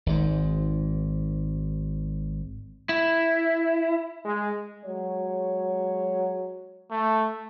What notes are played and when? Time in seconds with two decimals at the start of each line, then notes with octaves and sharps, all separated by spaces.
0.06 G#1 G#2
2.89 E4
4.24 G#3
4.85 F#3 G#3 C#5
6.91 A3